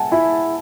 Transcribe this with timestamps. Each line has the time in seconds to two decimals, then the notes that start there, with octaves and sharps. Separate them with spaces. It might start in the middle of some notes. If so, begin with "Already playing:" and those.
Already playing: E5 F#5 G#5 A5
0.11 E4 E5 G#5